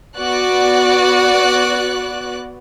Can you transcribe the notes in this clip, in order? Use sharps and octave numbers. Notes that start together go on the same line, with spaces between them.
B3 F#4 D5 F#6